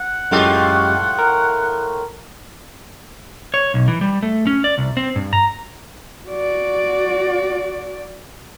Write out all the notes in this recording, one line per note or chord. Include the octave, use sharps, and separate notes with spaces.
F#5
F#2 A2 G#3 F4 G4 A4
A#4
C#5
B1
E3
G3
A3
C#4
D5
C2
C4
G2
A#5
F#4 D5